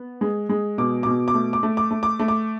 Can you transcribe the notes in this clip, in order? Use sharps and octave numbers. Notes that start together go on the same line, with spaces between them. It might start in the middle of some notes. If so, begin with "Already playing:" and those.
Already playing: B3
G#3
G#3
B2 D6
B2 D6
D6
A3
D6
A3
D6
A3
D6
A3
D6